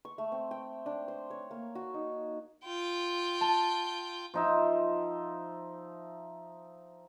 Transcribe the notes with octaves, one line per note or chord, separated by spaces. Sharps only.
C#6
A3
C4
G5
D4
C5
C#5
A#3
F#4
D#4
F4 G5
A5
F3 D#4 E5